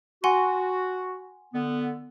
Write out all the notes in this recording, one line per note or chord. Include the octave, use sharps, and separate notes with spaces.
F#4 F#5 G#5 C6
D3 B3